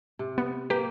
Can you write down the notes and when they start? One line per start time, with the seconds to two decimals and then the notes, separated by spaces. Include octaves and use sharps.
0.19 C3
0.38 B3
0.70 A#3 G4 B4